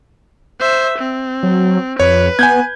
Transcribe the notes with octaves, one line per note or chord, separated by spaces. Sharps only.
C5 E5
C4
F#3
F2 B4 C#5
B3 G#5 G6 G#6